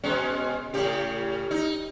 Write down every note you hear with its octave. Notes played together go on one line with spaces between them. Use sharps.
B2 G#3 C#4
A2 C#3 G4
D#4